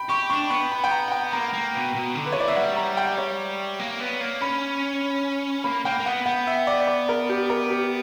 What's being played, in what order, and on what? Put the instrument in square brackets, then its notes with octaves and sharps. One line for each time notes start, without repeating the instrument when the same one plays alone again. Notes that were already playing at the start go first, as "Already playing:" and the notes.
Already playing: [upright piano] G5 B5
[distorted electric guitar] G4 [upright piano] C#6
[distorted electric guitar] D4 [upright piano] C#6
[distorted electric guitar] B3 [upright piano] C#6
[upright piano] B5
G5
A#5
F#5
G5
[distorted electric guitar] A#3 [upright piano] A#5
[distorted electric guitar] A#3
B2
B2
D3
[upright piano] B4
C#5
[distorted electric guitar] E3 [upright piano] D5
[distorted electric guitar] A#3 [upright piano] E5
[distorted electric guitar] G3 [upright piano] F#5
[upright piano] A#5
G5
C#5
[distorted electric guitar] A#3
B3
A#3
[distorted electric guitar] C#4 [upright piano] B5
[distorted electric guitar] A#3 [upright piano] B5
[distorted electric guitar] A#3 [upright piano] G5
[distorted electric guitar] A#3
[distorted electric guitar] B3 [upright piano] F#5
[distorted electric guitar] B3 [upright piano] F#5
[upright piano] E5
D5
D5
A#4
G4
A#4
G4